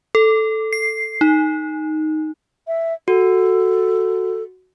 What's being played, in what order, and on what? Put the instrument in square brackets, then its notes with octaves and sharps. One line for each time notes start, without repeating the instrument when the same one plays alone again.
[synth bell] A4
C7
D#4
[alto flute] E5
[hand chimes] F#4 [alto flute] A4